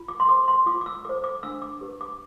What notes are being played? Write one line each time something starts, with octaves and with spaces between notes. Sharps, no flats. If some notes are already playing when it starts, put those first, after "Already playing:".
Already playing: F4
D6
C6
A4 C5 D6
C6
F4 D6
D6
E6
A4 C5 D6
D6
D4 E6
D6
G4 B4
D6